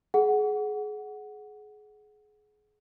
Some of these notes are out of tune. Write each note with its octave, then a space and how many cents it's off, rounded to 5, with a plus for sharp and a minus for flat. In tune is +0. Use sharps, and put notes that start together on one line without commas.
G#4 +25 F#5 +0